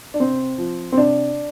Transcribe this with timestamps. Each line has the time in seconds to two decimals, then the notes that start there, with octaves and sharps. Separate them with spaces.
0.14 D4
0.20 C3 C4
0.58 F3
0.92 C4
0.97 C3 D4